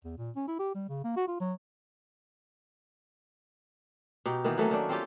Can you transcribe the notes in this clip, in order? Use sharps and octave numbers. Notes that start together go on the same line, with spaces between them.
E2
A#2
C#4
E4
G4
G3
C#3
A#3
F#4
F4
F#3
B2 D#4 G4
D#3 E3 A#3 B3
F#3 A3 A#3 C#4
D#3 C#4 D4
C4 C#4 F4 G4